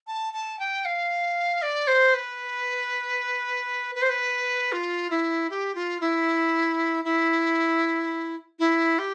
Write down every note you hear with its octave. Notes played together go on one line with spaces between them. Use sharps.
A5
A5
G5
F5
D5
C5
B4
B4
C5
B4
F4
E4
G4
F4
E4
E4
E4
G4